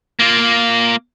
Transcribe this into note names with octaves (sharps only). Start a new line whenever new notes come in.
A#3 F4